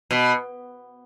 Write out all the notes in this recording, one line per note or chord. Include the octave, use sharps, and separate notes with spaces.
B2